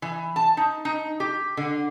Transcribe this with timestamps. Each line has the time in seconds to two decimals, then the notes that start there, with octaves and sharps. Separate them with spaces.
0.02 E3
0.36 A5
0.57 D#4
0.85 D#4
1.20 G4
1.57 D3